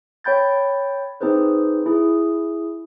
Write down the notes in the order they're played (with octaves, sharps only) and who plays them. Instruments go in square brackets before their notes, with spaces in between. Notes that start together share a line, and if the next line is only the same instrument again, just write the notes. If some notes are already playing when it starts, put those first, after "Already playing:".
[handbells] C#5 G5 B5 G6 A6
C4 D#4 G#4 B4 C5
E4 G#4